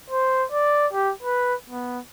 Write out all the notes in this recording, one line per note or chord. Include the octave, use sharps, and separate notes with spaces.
C5
D5
G4
B4
B3